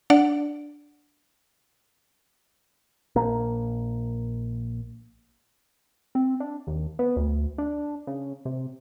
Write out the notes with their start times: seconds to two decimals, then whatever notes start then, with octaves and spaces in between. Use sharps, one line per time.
0.10 D4 D5 F#5 D7
3.16 A#1 A#3
6.15 C4
6.40 D4
6.67 D#2
6.99 B3
7.16 D2
7.58 D4
8.07 C#3
8.45 C3